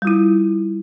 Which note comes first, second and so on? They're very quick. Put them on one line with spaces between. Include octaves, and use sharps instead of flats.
G3 F4 E4